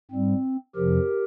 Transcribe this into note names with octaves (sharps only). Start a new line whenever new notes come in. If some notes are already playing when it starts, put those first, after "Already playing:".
G#2 G3 C4
F2 C3 F3 G4 A#4